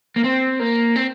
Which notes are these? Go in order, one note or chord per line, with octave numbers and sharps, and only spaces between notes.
A#3
C4
A#3
C4